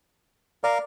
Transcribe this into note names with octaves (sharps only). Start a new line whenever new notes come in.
A#4 D5 F5